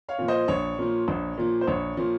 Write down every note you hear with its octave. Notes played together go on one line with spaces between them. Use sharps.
C#5 F5
A#2 F3
C5 D#5
A#1 C#5
A#2 F3
A#1
A#2 F3
C5
A#1 C#5
A#2 F3